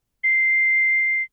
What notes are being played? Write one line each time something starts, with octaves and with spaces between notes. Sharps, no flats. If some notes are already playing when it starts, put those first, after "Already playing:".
C7